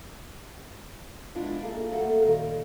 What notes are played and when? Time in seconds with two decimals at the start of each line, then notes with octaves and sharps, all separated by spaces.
1.35 G#3 B3 D4 E4 F4
1.62 A#3 G#4 A4 E5
1.92 G3 A3 A#3 F#4 A4 F#5
2.22 A#2 D#3 G3